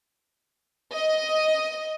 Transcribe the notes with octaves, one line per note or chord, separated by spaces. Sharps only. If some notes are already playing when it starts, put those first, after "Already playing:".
D#5